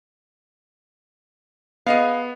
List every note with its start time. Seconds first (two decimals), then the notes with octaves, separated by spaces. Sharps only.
1.86 B3 G#4 D#5 F5